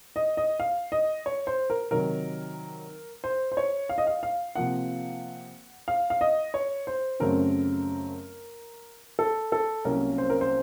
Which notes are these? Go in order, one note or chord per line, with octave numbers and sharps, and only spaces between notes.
D#5
D#5
F5
D#5
C#5
C5
A#4
C3 D#3 F#3 A#4
C5
C5
C#5
F5
D#5
F5
F5
C3 F3 A#3 F#5
F5
F5
D#5
C#5
C5
F#2 C#3 F#3 A3 C4 A#4
A4
A4
C2 C3 F#3 A#3 C#4 A#4
C5
A#4
C5